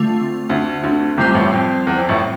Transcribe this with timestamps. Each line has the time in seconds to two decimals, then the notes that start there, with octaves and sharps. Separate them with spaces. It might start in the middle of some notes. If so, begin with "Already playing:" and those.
Already playing: D3 A3 C4 F4
0.49 D2 D3
0.83 D2 D3
1.17 C2 C3 G3 C4 F4 C5
1.34 A1 A2
1.52 F2
1.87 E2
1.97 F2
2.09 A1 A2